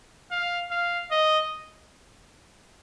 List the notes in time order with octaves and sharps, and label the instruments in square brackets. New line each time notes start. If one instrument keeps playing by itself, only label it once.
[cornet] F5
F5
D#5